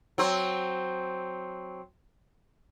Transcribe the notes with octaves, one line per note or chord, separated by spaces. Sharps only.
F#3 C4